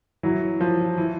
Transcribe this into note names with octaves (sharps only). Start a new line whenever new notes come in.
E3 F#3
F3
E3